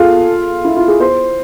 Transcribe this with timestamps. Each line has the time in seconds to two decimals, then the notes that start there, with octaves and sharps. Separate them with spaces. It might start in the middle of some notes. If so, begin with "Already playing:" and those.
Already playing: F4 G#4 A4
0.65 E4
0.76 F4
0.88 G#4
1.00 C5